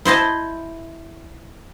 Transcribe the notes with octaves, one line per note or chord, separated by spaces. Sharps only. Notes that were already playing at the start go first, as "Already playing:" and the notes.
E4 C5 D#5 A5